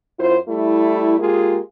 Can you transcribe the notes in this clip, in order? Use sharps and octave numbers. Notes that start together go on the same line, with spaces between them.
F#2 E4 F4 C5
G3 A3 E4
G#3 A#3 F4 G4 G#4